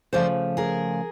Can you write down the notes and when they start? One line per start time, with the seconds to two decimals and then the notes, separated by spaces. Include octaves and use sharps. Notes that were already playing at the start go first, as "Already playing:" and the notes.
0.13 C#3 F3 A3 C5 D5
0.57 G#4 A#4